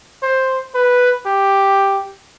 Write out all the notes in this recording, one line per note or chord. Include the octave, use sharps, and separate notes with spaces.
C5
B4
G4